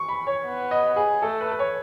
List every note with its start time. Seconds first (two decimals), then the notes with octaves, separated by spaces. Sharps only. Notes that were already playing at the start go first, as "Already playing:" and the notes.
Already playing: C#6
0.09 B5
0.27 C#5
0.46 B3
0.71 D#5
0.96 G#4
1.22 A3 A4
1.41 B4
1.51 B4
1.59 C#5